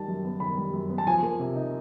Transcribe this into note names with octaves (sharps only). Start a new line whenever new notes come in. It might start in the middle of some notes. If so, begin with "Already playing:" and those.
Already playing: D#3 G3 A5
F#2
B3
D#3 B5
G3
F#2
B3
A5
F3 G#5
A#3
C3
D#4